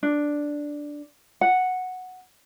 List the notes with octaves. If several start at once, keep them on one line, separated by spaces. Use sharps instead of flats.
D4
F#5